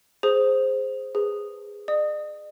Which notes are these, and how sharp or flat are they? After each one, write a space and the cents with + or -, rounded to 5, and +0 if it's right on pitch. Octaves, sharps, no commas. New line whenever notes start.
G#4 +0 C5 +0 D#6 +0
G#4 -10 B4 +0
D5 +45 D#6 +0